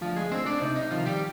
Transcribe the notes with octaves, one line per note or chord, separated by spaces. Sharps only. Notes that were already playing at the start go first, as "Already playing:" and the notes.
D2 F3 F4
G#3 G#4
D2 C4 C5
D4 D5
C3 D#4
D#4
D#3 F3 F4
G3 G4